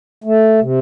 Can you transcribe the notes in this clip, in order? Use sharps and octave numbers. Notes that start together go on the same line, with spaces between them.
A3
C3